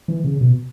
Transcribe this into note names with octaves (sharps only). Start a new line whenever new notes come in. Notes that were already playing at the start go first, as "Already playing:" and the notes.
E3
C#3
B2